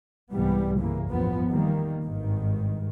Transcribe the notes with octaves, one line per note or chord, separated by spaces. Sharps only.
C2 G#2 E3 G3 B3
G2 C#3 E3 A#3
G1 E2 A2 F3 B3
D#3 G3 A#3
G#1 G2 D#3